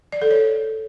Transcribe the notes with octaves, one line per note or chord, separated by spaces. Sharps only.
D5
A4
C#5